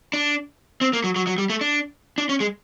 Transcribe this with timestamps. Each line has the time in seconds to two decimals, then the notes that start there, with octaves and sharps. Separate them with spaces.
0.13 D4
0.81 C4
0.93 A#3
1.04 F#3
1.16 F#3
1.27 F#3
1.38 G3
1.50 A3
1.61 D4
2.18 D4
2.29 C#4
2.40 G#3